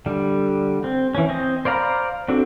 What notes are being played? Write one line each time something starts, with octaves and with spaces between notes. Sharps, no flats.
D3 G3
C4
E3 C#4
C4 D#5
C5 D5 F5 A#5 B5
C4 D4 F#4 A4